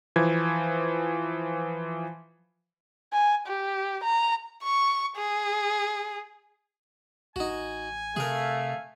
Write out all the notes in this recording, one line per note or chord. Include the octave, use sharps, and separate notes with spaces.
E3 F3 G#6
G#5
G4
A#5
C#6
G#4
A1 D#4 F#4 G#5
C3 A3 G#4 A#4 F5